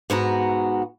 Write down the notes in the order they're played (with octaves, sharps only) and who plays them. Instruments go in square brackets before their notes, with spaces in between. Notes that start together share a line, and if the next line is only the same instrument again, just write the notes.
[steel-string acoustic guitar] G#2 B3 F#4 A#5